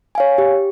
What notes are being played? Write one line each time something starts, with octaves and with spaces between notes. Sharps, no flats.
C#5 F5 G#5
G4